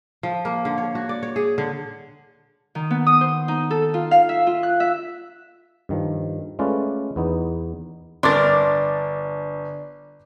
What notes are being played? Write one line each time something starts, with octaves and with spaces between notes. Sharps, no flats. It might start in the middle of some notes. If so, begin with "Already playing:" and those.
F3
A#3
D3
C#5
F#4
D5
C#5
G#4
D3
D#3
B3
D#6
C5
D#4
A4
F4
F5
E5
F4
F#6
E5
G2 D#3 F3
G#3 A3 C#4 F4 B4 D5
E2 B3 D#4
G1 D4 A#4 D5 C6 D6 A6